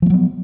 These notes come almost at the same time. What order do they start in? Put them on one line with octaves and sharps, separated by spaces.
F3 A#3 F#3 B3